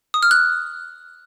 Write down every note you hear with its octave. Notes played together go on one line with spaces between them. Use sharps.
D#6
F6
F#6